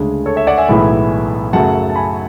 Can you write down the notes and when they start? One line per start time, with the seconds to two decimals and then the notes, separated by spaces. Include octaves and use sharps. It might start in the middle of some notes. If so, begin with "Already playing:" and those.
Already playing: D2 C#3 G#3 D4
0.26 A4 C#5
0.36 C#5 E5
0.47 D5 F#5
0.57 E5 G#5
0.69 B1 A2 E3 G#3 B3
1.53 F#2 C#3 F#3 A3 F#5 A5
1.90 A5
1.96 G#5 B5